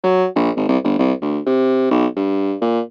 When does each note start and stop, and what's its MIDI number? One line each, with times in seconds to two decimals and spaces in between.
0.04 0.26 54
0.35 0.50 34
0.57 0.67 32
0.68 0.78 36
0.84 0.98 31
0.99 1.13 36
1.21 1.39 38
1.46 1.86 48
1.91 2.06 35
2.16 2.55 43
2.62 2.81 46